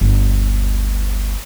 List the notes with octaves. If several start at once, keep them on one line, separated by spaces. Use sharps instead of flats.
G1 D2